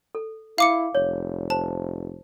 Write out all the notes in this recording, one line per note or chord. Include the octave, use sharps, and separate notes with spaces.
A4
E4 F5 D6 C#7
F1 C#5
C5 A5